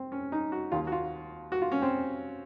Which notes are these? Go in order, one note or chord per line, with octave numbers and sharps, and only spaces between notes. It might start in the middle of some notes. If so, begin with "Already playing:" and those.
Already playing: C4
C#4
D#4
F#4
D#2 D#3 F4
F#4
F4
F#4
F4
C#4
C4